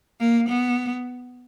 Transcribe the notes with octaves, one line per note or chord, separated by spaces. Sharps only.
A#3
B3